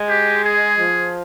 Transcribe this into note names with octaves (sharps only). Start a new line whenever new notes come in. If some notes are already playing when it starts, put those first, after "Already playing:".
Already playing: G#3
G4
G#4
F3